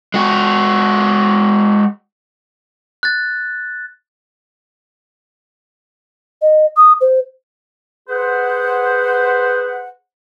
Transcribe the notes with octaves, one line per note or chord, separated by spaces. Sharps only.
G#3 F#4
F#6 A6
D#5
D#6
C5
G#4 B4 C5 F#5